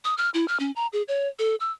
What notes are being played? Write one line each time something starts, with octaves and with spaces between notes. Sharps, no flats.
D#6
F6
E4
F6
C#4
A#5
G#4
C#5
A4
E6